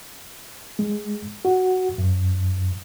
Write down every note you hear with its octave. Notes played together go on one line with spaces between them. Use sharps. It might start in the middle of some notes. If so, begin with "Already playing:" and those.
G#3
F#4
F#2